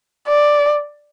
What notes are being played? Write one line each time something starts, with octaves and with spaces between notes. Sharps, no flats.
D5